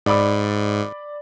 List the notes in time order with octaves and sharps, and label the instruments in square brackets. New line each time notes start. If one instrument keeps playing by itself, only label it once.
[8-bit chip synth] G#2 [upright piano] D5 B5 D6